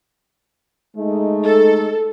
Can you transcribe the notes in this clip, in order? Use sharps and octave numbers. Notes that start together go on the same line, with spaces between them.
G#3 A3 D#4
A4